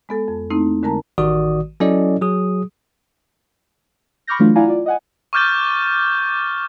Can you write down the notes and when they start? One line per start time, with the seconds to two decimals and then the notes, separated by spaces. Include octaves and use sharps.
0.09 G#3 B3 A4
0.28 F2
0.50 A3 A#3 C4 D#4 E4
0.83 D3 G#3 A#4 A5 A#5
1.18 A1 D#3 F#4 D5 D#6
1.80 F#3 C#4 E4 A4 D5 D#5
2.21 F#3 G#4 D#6
4.27 B5 C#6 D6 F6 G6 A#6
4.39 E3 F#3 A3 D4 F4
4.55 E4 D5 F5 F#5 G#5 A#5
4.68 F4 D5
4.86 D#5 F#5 G#5
5.33 C#6 D6 F6 G6 A6 G7